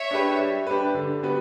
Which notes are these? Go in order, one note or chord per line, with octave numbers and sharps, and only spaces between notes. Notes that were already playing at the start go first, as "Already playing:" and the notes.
Already playing: C#5 E5
D4 G4 B4
G3
D4 G4 B4
D3
G3 B3 F#4 B4